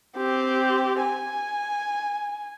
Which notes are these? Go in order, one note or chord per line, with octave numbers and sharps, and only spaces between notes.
C4 G4
G#5